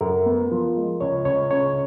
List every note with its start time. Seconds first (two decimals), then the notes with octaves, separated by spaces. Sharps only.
0.01 F#2 A#4
0.26 B3
0.51 F3
0.76 G#3
1.01 C#2 C#5
1.25 C#2 C#5
1.51 C#3 C#5